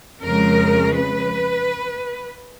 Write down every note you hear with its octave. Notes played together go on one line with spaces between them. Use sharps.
F2 C#3 G#3 A#4
B4